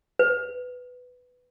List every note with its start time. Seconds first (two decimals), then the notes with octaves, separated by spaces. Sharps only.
0.19 B4